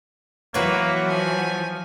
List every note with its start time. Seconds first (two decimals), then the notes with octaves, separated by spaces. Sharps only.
0.54 E3 F#3 A#3 F#4 B4 C#5
1.08 F3 G#5